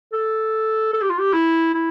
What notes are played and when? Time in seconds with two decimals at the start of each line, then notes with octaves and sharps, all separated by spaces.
0.13 A4
0.93 A4
1.02 G4
1.10 F4
1.18 G4
1.33 E4
1.74 E4